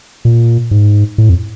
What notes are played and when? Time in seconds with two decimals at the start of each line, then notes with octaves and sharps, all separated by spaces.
0.25 A#2
0.71 G#2
1.18 A2
1.29 F2